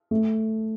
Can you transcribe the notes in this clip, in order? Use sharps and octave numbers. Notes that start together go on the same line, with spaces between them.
A3